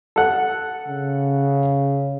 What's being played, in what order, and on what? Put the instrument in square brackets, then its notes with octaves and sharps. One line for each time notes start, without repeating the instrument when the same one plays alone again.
[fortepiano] A4 F#5
[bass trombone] C#3